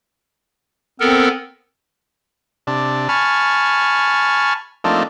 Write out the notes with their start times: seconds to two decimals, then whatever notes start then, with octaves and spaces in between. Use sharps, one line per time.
1.00 B3 C4 A4 A#4
2.67 C3 D4
3.09 G#5 A5 B5 C#6 F6
4.84 F3 A3 A#3 C4 D4 D#4